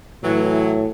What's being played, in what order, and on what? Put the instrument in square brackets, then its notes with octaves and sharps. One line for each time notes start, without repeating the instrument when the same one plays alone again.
[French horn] A2 [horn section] E3 F#3